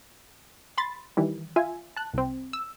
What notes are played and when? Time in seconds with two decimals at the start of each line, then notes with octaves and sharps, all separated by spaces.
0.78 B5 C6 A6
1.17 D#3 E3 G3
1.56 F4 E5 G#5
1.96 A5 F#6
2.13 C2 C4
2.53 E6